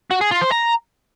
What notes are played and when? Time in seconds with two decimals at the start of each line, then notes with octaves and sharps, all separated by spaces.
0.11 F#4
0.21 G#4
0.31 F4
0.41 C5
0.52 A#5